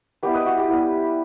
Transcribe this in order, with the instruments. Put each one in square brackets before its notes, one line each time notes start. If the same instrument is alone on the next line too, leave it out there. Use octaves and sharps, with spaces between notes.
[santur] G3 B3 E4 G4 B4
B4 D#5
F#4
G4
G3 B3 E4